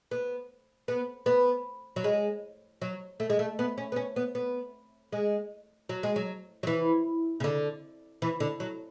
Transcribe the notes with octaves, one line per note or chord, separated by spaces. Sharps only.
B3
B3
B3
F#3
G#3
F#3
A3
G#3
A3
B3
C#4
B3
C#4
B3
B3
G#3
F#3
G#3
F#3
F#3
E3
C#3
D3
E3
D3
F#3